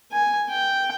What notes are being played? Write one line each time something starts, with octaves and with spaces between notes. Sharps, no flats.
G#5
G5